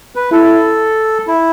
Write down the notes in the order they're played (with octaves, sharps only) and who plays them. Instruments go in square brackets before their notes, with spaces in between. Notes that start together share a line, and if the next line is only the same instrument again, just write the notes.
[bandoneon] B4
[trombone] E4 [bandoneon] A4
[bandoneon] E4